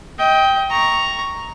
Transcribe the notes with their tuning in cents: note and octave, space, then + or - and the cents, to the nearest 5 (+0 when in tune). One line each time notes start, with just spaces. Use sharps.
D#5 +30 G5 +0
A#5 +0 C#6 +0